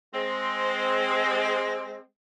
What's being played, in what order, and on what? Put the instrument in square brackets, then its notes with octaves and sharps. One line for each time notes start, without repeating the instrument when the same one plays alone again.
[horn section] G#3 C4